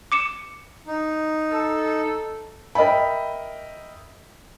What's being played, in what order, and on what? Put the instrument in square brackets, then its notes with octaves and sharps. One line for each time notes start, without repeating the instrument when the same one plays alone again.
[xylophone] D6 C#7 E7
[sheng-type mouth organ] D#4
[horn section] A4
[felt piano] A#4 D#5 E5 G5 B5